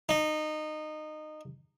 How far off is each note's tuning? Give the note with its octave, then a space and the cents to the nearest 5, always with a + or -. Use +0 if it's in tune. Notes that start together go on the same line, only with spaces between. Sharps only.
D#4 -20